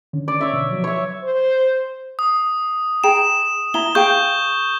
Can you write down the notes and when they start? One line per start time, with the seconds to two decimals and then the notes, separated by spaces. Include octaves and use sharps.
0.13 D3 D#3 C#4
0.28 D5
0.41 C#4 C#5 E5
0.53 B2 D3
0.70 F3 F#3
0.84 C#5 E5
1.23 C5
2.19 D#6
3.04 G#4 G5 A#5 E7
3.74 E4 A#5 G7
3.95 G#4 F5 G5 C#6 G6